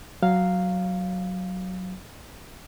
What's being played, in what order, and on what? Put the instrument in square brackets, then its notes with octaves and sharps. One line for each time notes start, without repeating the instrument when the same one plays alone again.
[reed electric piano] F#3 F5